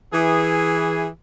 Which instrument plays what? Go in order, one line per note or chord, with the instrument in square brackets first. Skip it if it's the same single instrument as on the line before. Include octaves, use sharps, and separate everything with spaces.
[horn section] E3 G#4